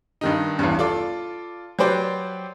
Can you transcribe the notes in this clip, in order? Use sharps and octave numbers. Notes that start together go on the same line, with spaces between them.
G2 D#3 D#4
A1 E2 G2
F4 A4 D5
F#3 G4 B4 C5 D5 G5